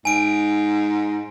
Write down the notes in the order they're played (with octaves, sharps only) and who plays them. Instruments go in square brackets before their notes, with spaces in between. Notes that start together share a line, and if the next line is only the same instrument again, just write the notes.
[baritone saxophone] G#2 [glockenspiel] G#5 D7